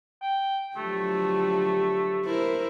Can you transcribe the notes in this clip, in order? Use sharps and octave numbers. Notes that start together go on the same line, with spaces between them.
G5
D3 F3 F#3 A3 G4
E4 A#4 C5